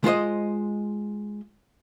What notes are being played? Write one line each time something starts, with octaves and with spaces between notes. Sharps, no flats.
G#3 F4 C5 D#5